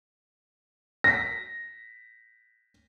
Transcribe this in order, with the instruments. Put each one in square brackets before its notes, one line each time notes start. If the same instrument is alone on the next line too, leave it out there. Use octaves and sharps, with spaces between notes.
[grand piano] A#6 B6